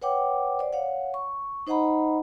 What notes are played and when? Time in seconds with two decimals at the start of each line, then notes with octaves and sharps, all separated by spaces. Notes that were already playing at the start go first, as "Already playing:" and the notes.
0.02 B4 C#5 F#5 G5 D6
0.59 C5 D5
0.73 C#5 F5 F#5
1.14 C#6
1.67 D#4 C5 D#5 F#5 A#5 B5